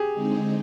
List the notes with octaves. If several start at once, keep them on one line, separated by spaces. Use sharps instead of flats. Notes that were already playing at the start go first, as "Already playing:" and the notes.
Already playing: G4 G#4
D3 G#3 C4 D#4